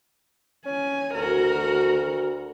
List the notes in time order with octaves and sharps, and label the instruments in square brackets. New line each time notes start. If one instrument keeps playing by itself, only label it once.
[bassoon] C#4 [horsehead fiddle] G#5
[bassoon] D2 [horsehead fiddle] F#4 A#4